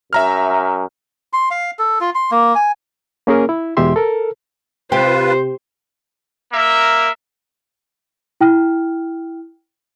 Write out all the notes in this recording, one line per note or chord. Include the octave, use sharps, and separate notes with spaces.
F#2 E5 A#5 F6
C6
F5
A4
F4
C6
A#3
G#5
A#3 C#4 G#4 A#4
E4
E2 B2 G#3 G4 E5 C6
A4 A#4
C3 F4 G4 B4 C5
A#3 A#4 E5
E4 G5 F6